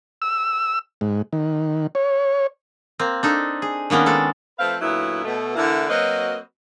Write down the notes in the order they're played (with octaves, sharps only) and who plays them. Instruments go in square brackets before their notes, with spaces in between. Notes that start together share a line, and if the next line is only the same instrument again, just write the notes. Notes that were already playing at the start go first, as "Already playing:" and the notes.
[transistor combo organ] E6
G#2
D#3
C#5
[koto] A#3 C4
D4 D#4 A4
G#4
D#3 A#3 B3 C#4 D4
G#3 A4 A5
[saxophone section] F3 A3 C4 B4 F5
A#2 D3 F#3 B3 E4
B2 A3
D3 E3 A#3 D4 E4
F#3 A#3 C4 F#4 B4 D#5